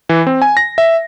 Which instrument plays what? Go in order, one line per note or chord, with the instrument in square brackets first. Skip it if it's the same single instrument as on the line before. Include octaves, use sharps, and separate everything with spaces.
[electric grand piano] E3
C4
G#5
A#6
E5